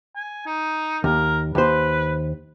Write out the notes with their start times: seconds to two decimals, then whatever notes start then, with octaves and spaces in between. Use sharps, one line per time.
0.16 G#5
0.46 D#4
1.04 D#2 A#4
1.55 D#2 B4 C5